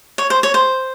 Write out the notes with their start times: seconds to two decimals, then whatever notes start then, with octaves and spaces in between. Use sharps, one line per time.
0.18 C#5
0.30 C5
0.43 C#5
0.54 C5